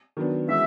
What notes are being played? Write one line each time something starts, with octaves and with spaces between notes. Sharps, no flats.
D#3 F#3 B3 D4
E3 G#3 C#4 F#4 E5